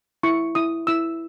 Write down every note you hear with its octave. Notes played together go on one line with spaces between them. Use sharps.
E4 C#6
E4 D#6
E4 E6